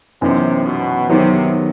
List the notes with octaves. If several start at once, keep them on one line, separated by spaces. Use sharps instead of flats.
F#2 C3 E3 B3 D#4
B2
C3 D#3 F#3 B3